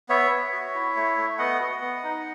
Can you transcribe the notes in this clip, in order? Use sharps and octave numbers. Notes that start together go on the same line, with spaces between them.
B3 C#5 E5
B3
F#4
E4
A3
A3
B3 D#5 F#5
F#4
B3
D#4